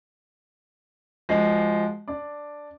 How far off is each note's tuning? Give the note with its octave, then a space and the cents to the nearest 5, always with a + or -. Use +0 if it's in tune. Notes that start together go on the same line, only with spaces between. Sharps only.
F3 -15 G#3 +0 F#4 +0
D4 +0 D5 +0